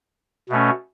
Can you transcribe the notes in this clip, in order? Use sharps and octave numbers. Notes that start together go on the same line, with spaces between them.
B2 A3 C#4